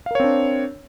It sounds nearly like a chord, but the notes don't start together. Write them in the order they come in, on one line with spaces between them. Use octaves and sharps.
F5 A#4 C#5 C4 D4